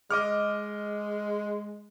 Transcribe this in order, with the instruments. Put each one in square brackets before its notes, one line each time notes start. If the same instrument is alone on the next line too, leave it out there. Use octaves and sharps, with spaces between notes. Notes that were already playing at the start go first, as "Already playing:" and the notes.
[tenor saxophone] G#3 [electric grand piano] D#5 D6 F6